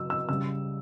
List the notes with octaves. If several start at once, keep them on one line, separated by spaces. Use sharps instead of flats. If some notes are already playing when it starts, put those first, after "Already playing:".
Already playing: C#3 F#3 E6
E6
C#3 G3 E6